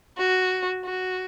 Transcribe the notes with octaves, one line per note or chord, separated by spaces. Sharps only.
F#4
F#4